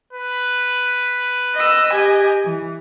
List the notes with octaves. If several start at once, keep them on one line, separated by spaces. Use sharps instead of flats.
B4
D#5 E6
G4 D#5 G#5
E3